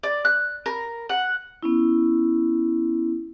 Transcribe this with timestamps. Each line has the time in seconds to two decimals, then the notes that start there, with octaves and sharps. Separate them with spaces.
0.03 D5
0.25 F#6
0.66 A#4
1.09 F#5
1.63 B3 C#4 E4